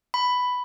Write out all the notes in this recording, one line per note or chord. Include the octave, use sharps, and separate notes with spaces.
B5